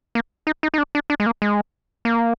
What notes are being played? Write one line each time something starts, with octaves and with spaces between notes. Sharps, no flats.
A#3
D#4
D#4
D#4
D4
D4
D4
G#3
A#3
G#3
A#3